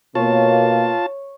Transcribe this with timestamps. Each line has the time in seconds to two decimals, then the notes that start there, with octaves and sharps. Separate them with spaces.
0.15 B2 A#3 F4 C#5 A5